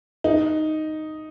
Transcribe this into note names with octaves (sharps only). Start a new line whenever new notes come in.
D#4